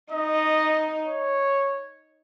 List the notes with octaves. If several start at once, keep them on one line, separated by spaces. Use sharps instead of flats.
D#4 D#5
C#5